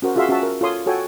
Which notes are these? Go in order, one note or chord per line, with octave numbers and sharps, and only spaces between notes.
C#4 F#4 A#4 C5
F4 F#4 G#4 E5 F5 C6
C#4 F#4 E5 A5
A#4
F4 A4 C#5 C6 D#6
F#4 A4 C#5 G5 G#5